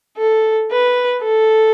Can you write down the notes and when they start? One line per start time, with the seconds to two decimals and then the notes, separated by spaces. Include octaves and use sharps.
0.18 A4
0.71 B4
1.23 A4